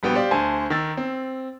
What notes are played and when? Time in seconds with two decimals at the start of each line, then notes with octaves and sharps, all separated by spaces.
0.03 A#1 G3 B3 F#4 G5
0.15 G4 C5 D5 F5
0.31 D2 C5 G#5 A5
0.70 D#3 E6 A6
0.97 C4